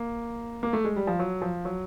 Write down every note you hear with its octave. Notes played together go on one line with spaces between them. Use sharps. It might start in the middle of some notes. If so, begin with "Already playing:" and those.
Already playing: A#3
A#3
A3
G#3
G3
F3
F#3
F3
F#3